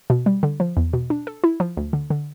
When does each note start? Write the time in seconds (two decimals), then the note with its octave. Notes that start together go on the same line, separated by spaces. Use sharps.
0.10 B2
0.26 G3
0.43 D3
0.60 F3
0.77 E2
0.93 B2
1.10 D4
1.27 A4
1.44 E4
1.60 F3
1.77 D2
1.93 D3
2.10 D3